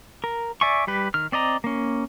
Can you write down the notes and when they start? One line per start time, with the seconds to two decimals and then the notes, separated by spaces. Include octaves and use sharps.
0.24 A#4
0.61 D5 E5 G#5 C#6
0.87 G3 G4 B4
1.14 D#3 F6
1.32 C4 D5 D#5 A#5
1.64 A#3 C#4